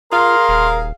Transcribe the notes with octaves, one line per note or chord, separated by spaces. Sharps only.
F4 G#4 A#4 F5 C6
D#1